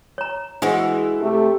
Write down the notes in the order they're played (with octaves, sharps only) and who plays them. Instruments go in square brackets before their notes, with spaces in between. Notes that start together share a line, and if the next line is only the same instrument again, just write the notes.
[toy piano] C#5 A#5
[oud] E3 G#3 F#4 [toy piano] D4 C5
[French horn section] C3 A3 [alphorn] G4